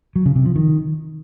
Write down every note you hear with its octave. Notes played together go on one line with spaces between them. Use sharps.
F#3
C#3
C3
F3
D#3